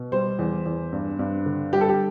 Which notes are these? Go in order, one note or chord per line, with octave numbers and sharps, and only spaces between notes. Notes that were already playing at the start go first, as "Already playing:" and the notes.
Already playing: B2
G3 C5
E2
E2
G2
G2
D3
G3 G4
A4
G4